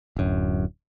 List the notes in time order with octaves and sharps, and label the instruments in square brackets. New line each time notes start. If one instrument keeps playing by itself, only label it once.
[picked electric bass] D1 F#2